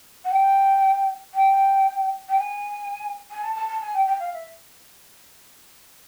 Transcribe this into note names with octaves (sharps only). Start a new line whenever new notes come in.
F#5
G5
G5
G5
G#5
G#5
A5
A5
A5
G#5
G5
G5
F5
E5